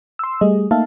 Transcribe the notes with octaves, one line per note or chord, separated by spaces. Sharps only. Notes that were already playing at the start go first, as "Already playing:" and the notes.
C6 E6
G3 A3 G#4 D#5
A3 A#3 D#4 E5 F5 A5